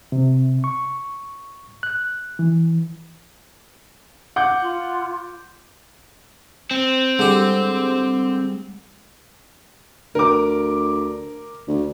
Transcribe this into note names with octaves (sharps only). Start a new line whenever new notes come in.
C3
C#6
F#6
E3
F#5 D6 G6
F4
C4
D3 G3 G#3 G4
D2 A#4 D6
D2